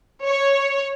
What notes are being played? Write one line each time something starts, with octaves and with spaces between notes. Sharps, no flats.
C#5